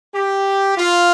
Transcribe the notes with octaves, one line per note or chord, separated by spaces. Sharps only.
G4
F4